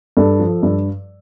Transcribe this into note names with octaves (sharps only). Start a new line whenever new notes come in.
G2 A4
F3
G2